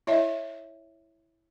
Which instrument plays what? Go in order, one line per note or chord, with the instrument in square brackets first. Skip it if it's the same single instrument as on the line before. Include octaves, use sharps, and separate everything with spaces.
[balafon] E4 C#5 D#5 E5